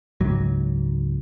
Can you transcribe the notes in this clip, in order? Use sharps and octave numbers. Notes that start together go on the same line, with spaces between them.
C#2 G#2 F#3